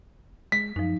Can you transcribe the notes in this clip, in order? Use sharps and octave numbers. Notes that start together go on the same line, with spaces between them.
G#3 B6
F#2 F3 D#4